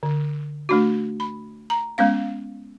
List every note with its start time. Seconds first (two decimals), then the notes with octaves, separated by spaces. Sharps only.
0.03 D3
0.69 A3 D4 F#4
1.20 B5
1.70 A#5
1.98 G#3 B3 C#4 F5